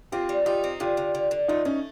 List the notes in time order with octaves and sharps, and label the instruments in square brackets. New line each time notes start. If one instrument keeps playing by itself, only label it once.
[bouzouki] C4 [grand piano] F4 G4
[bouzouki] G3
[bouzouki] D#4 [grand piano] F4 G4
[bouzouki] C4
[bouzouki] D3 [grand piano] F4 G4
[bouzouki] D3
D3
D3
[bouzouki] A3 [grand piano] D#4 F4
[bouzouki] A3 [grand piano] C#4 D#4